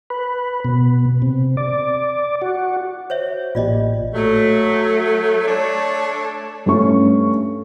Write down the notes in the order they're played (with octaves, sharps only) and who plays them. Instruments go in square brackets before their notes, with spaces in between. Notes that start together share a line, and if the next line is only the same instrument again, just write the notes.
[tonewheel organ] B4
B2
C3
D5
F#4
[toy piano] C5 C#5 E5
[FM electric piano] A1 A#2 G4 [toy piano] F4 D5 D#5
[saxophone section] F#3 A3
A3 D4 C#5
[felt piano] G2 A3 C#4 C#6